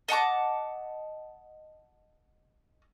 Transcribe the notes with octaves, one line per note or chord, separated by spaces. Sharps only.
D#5 F#5 A5 D6